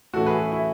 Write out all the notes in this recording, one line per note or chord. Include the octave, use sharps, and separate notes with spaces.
A2 E3 A3 C#4 F#4 A4
G#4 B4
F#4
E4